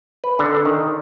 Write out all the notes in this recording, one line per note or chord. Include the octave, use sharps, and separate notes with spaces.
B4
D3
D#3